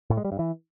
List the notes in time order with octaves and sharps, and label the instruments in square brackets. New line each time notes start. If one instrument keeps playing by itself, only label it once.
[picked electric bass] A2
G#3
G3
G2
E3